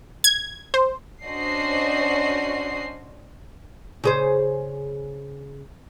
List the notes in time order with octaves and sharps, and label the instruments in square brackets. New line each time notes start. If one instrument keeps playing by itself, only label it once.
[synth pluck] G#6
C5
[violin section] C#4 D4 F#4 C5 D#5 C7
[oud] C#3 G#4 C5